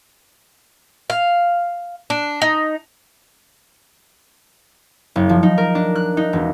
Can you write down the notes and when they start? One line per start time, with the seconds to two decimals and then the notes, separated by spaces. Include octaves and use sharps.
1.10 F5
2.10 D4
2.42 D#4
5.16 F#1
5.29 F3
5.43 D#4
5.58 A#4
5.75 D4
5.95 F#6
6.17 D#4
6.33 E1